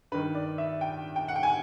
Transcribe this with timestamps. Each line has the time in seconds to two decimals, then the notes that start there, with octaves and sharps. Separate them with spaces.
0.12 G2 D#3 B4
0.35 D5
0.58 E5
0.81 G5
1.16 G5
1.28 F#5
1.36 G5
1.43 G#5